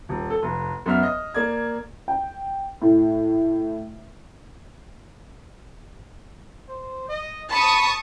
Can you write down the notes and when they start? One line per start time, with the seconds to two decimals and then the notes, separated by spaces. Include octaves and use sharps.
0.09 D#1
0.30 A4
0.43 F1
0.86 F#2 B3 E5 F6
1.03 D#5
1.34 A#3 D5 G#6
2.08 G5
2.82 A2
6.69 C5
7.09 D#5
7.52 A5 B5 C#6 D#6